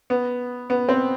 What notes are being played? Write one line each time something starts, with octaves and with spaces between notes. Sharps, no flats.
B3
B3
C4